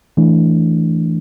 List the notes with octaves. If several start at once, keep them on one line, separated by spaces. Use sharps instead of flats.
E3 A3 D4